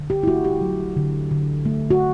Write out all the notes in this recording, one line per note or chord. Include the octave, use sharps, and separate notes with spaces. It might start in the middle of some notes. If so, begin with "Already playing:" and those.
Already playing: D3
G4
E4
A3 F#4
G4
F#3
D3
D3
A3
F#4